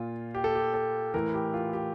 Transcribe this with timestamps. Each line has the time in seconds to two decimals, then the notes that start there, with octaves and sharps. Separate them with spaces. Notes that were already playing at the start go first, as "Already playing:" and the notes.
Already playing: A#2 F4
0.35 G4
0.44 A4
0.55 G4
0.74 A4
1.14 A2 E3 A#4
1.34 G4
1.54 F4
1.73 G4